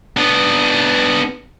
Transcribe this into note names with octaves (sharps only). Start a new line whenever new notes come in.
B3 D4